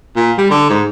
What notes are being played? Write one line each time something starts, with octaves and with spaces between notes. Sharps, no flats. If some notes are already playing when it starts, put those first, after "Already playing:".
A#2
G3
D3
G#2